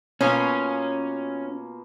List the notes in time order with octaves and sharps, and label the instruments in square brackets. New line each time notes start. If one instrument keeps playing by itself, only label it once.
[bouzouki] B2 A#3 F4 [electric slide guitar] C#4